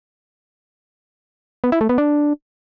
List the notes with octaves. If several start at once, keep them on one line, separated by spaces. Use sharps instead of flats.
B3
E4
A3
B3
D4